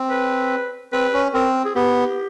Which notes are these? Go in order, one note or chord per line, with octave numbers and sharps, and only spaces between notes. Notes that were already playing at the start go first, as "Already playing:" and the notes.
Already playing: C4
B4
C4 B4
C#4
C4 A#4
G#4
B3 G4